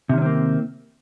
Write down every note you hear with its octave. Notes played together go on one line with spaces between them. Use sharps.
C3 D#3 A#3 C4 C#4